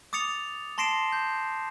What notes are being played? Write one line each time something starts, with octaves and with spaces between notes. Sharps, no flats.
D6 D#6 A6 C#7 F7
A5 C6 A#6 C7 D7 E7
G6